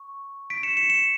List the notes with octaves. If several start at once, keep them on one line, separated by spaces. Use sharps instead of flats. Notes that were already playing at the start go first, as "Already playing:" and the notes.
Already playing: C#6
B6 D7
C#7 E7
C#7 E7
C#7 E7